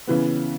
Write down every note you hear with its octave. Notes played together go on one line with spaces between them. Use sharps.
C#3 E3 B3